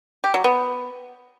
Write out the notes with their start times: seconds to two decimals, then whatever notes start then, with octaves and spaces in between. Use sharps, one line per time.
0.24 G4
0.34 F#3
0.44 B3